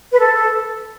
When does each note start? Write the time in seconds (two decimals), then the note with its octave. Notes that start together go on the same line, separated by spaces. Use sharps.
0.13 B4
0.20 A4
0.35 A4